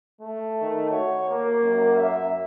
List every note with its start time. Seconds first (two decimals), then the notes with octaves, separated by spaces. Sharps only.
0.21 A3
0.62 D#3
0.91 F#4 C#5
1.29 A#3
1.63 F#2
1.97 E5